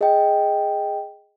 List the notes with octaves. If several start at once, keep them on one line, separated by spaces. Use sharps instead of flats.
G#4 D#5 G5